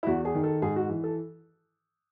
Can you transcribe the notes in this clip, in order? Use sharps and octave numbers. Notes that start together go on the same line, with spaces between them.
E4
E2 F#4
G#4
D#3
A4
G#2 G#4
F#4
E3
A4